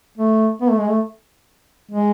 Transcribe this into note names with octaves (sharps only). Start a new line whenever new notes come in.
A3
B3
A3
G#3
A3
G#3